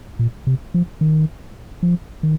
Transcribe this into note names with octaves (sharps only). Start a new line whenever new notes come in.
A#2
C3
F3
D#3
F3
D#3